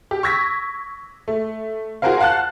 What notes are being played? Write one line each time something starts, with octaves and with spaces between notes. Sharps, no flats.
G4
C#6 E6 G#6 A#6 B6
A3
F4 F#4 G#4 A#4 C5 F5
F5 F#5 A5 F#6